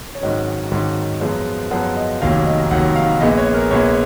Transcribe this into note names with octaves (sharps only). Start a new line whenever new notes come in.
C#5
G#1 G#2 D#3 F#3 C#4 D#5
G#1 G#2 D#3 F#3 C#4
F#2 F3 G#3 B3 F5
F#2 F3 G#3 B3 F#5
D#5
F1 D#2 D#3 F#3 F5
D#5
F1 D#2 D#3 F#3 F#5
F5
A#1 A#2 G#3 B3 D#5
C#5
A#4
A#1 A#2 G#3 B3 C#5